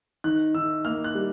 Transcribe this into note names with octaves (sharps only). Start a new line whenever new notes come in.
D#3 F#6
D#3 E6
A#3 F6
F#6
G3